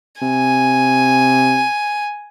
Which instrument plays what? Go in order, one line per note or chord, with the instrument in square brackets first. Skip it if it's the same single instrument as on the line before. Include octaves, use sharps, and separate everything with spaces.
[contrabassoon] C3 [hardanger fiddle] G#5